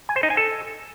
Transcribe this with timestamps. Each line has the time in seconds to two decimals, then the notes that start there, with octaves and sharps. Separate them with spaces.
0.09 G#5
0.16 C5
0.23 D#4
0.30 G#5
0.37 A4